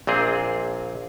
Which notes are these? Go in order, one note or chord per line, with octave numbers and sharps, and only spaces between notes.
A#1 A#2 C4 G#4